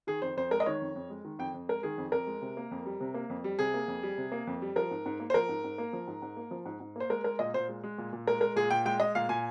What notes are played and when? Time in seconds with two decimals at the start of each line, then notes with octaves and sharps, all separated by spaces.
0.07 D#3 G#4
0.22 F2 C5
0.37 F2 C5
0.51 G#3 A#4
0.60 D#5
0.66 D#3 C#5
0.82 F2
0.96 F2
1.10 G#3
1.25 D#3
1.39 F2 G5
1.54 F2
1.69 G#3 A#4
1.83 D#3 G#4
1.98 F2
2.12 F2 A#4
2.27 G#3
2.42 C3
2.57 A#3
2.71 F2
2.86 G3
3.00 C3
3.14 A#3
3.30 F2
3.44 G3
3.59 C3 G#4
3.74 A#3
3.88 F2
4.03 G3
4.18 C3
4.32 A#3
4.47 F2
4.62 G3
4.76 F3 A#4
4.91 G#2
5.06 G#2
5.20 A#3
5.30 C5
5.34 F3 A#4
5.49 G#2
5.64 G#2
5.78 A#3
5.93 F3
6.08 G#2
6.22 G#2
6.37 A#3
6.51 F3
6.65 G#2
6.80 G#2
6.96 A#3 C5
7.10 G#3 A#4
7.24 G#3 A#4
7.39 A#2 D#5
7.54 A#2 C5
7.69 G#3
7.84 G#3
7.98 A#2
8.13 A#2
8.27 G#3 A#4
8.41 G#3 A#4
8.56 A#2 G#4
8.70 A#2 G5
8.85 G#3 G5
9.00 G#3 D#5
9.15 A#2 F5
9.29 A#2 G#5